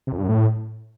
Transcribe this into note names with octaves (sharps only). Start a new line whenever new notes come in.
C3
F2
G2
F#2
A2